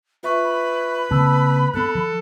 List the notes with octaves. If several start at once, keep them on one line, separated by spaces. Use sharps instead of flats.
F4 B4 E5 C#6
B5
C#3 A#3 C4 A5 E6
G2 B3 A4 F#6
F3